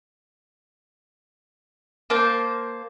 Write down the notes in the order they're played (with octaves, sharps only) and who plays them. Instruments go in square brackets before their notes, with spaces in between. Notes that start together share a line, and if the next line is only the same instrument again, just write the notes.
[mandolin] A#3 C5 A5 G6